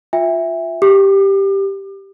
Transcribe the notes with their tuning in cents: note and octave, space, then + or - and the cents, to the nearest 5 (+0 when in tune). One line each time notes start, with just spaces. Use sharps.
F4 +15 E5 +0 G5 +45
G4 +0 D6 +35